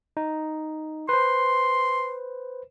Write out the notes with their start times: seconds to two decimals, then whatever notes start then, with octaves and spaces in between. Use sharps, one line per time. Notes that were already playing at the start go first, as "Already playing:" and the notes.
0.17 D#4
1.09 B4 C5 C6